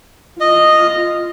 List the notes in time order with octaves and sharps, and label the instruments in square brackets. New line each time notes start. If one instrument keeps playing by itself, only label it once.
[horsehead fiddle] F4 [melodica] D#5